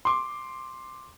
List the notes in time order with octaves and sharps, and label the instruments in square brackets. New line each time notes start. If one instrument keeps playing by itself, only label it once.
[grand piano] C6 D6